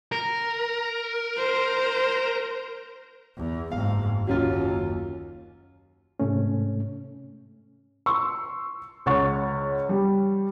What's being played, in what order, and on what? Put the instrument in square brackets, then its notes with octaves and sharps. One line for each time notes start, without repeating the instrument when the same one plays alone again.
[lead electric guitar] A#4
[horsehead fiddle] C5
[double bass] E2
[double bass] F#1 G#2 [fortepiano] F5
[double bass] F#1 D#2 [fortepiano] F#3 C#4 F4
[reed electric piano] G#2 C3 A3 C#4
[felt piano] C6 C#6 E6
C#2 C#5 F#5 C#6 A6
G3